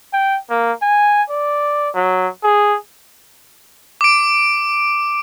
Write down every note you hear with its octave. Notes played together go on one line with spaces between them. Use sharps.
G5
A#3
G#5
D5
F#3
G#4
D6 D7